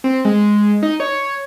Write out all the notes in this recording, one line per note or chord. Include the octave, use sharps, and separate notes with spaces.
C4
G#3
D#4
C#5